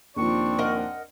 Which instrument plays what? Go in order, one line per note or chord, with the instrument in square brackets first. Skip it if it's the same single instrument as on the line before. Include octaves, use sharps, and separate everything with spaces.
[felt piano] D#2 A#2 F3 [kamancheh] C4 D4 [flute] C#6
[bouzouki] A#4 D#5 F#5